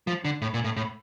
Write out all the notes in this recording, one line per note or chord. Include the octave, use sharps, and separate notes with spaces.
F3
D3
A2
A#2
A2
A2